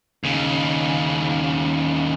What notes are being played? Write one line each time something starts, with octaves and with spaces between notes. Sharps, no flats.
D#2 C#3